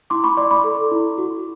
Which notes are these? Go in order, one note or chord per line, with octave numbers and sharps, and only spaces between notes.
E4 C6 D6
B5 C#6
D5 C6 D6
B5 C#6
A4
E4
F#4